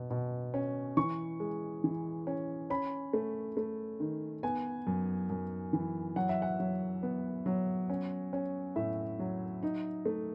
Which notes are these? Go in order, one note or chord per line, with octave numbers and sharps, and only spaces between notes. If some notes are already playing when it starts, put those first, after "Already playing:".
Already playing: B2
B2
C#4
E3 C#6
G#3
E3
C#4
C#4 B5
A3
A3
D#3
B3 G#5
F#2
F#2
E3
F#3 F#5
E5
F#5
F#3
B3
F#3
C#4
C#4
A2 E5
F#3
D#4
A3